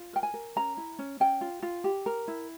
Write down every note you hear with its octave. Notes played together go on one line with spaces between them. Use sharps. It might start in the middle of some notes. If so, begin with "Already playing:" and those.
Already playing: F4
A#4 G5
G#5
A#4
C#4 A#5
E4
C#4
C#4 G5
F4
F4
G4
A#4
E4